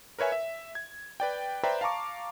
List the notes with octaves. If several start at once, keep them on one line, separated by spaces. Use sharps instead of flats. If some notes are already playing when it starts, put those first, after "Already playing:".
A#4 B4 C#5 E5 G#5
E5
G#6
B4 D5 G5
B4 C5 D5 E5 G5 A#5
F5 A5 A#5 C#6 D6